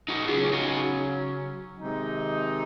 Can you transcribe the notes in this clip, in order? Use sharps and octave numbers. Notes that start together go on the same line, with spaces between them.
D#4 F#4
C#3 F#3 C#4 F4 G#4
D#4 F#4
C3 D#3 G#3 D#4